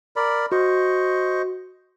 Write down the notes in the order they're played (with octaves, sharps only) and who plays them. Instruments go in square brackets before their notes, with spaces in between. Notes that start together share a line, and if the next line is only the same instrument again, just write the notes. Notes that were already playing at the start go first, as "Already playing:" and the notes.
[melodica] A#4 D5 B5
[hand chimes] F#4 [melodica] C5 D#5 C#6